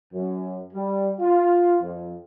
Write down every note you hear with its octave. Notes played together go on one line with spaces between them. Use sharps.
F#2
G3
F4
F2